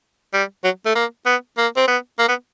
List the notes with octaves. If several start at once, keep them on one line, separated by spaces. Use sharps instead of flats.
G3
F#3
A3
A#3
B3
A#3
C4
B3
A#3
B3